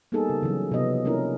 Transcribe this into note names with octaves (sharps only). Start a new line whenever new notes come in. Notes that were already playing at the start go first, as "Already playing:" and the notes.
G3 A#3 B3 D#4 G#4 A4
C#3
C#3 E3 F#3
C3 F3 B3 D#5
A#3 C#4 D4 E4 A#4